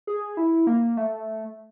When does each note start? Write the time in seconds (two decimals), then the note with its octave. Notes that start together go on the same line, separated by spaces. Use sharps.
0.07 G#4
0.37 E4
0.67 A#3
0.97 A3